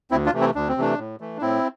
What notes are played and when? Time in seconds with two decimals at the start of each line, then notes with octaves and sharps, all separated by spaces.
0.11 D2 C4 E4
0.26 D4 F4
0.33 C3 E3 A3
0.40 C4 E4
0.55 D2 D4
0.68 C4
0.77 C3 E3 A3 D4
0.99 A2
1.20 E3 A3
1.37 D4
1.41 A2 C4 E4